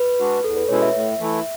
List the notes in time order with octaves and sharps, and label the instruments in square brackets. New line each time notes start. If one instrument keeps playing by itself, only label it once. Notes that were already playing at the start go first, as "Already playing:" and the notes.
Already playing: [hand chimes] B4
[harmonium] G#3 D4 F#4
[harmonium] E2 [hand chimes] A4
[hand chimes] B4
[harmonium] B2 G#3 C#4 E4 [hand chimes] C#5
[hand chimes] E5
[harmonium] A2
E3 A3 E4